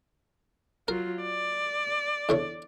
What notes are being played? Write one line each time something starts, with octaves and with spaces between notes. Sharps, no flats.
F#3 F4 A#4
D5
E2 D3 C#5